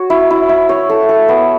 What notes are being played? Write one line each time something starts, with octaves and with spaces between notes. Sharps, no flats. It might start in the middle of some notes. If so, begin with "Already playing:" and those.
Already playing: F#4 C#5
E4
E4
E4
C#5
A4
A4
B3